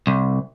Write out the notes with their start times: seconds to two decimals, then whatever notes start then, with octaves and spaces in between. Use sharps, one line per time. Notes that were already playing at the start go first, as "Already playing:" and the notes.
0.07 C2